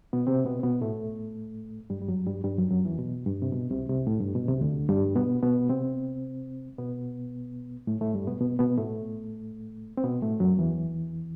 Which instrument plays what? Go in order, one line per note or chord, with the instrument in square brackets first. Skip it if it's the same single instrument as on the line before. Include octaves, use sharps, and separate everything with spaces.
[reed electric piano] B2 B3
C3 C4
B2 B3
C4
B2 B3
A2 A3
G2 G3
G3
F#2 F#3
G2 G3
G2 G3
F#2 F#3
F#2 F#3
E2 E3
B2
G2
C3
B2
C2 C3
C2 C3
A2
G2
B2
C2 C3
D2 D3
G2 G3
B2 B3
B2 B3
C3 C4
B2 B3
A2 A3
A2 A3
G2 G3
B2 B3
B2 B3
B2 B3
A2 A3
C4
B2 B3
A2 A3
F#2 F#3
E2 E3